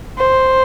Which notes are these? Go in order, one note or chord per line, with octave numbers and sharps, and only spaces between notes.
C5